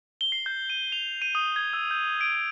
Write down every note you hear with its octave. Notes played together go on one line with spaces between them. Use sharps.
G7
C7
G6
D#7
F7
D#7
D#6
G#6
E6
G6
D7